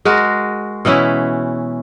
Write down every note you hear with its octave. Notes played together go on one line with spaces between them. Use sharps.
G#3 F#4 A#4
B2 E3 C#4 E4